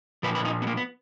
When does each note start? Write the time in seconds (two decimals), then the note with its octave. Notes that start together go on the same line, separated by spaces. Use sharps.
0.23 A#2 F3 B4
0.35 B4
0.45 D#4
0.62 B3
0.67 A#3
0.77 B3